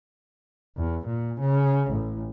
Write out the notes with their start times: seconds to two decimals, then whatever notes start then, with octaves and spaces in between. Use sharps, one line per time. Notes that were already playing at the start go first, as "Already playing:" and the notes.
0.77 E2
1.06 A#2
1.40 C#3
1.90 A1